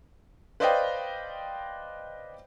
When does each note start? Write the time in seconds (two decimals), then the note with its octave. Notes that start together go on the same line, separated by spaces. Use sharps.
0.60 B4 C5 D5 D#5 F5 G5